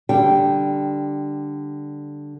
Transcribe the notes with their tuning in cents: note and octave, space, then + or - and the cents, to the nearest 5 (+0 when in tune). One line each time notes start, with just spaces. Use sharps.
D3 +0 G3 +0 G5 -15